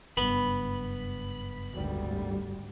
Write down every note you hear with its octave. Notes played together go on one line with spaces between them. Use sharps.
F#1 G2 B3 B5
G#1 D2 G3